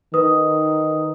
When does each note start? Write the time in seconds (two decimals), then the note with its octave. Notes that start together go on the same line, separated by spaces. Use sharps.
0.14 D#3 B4 D#6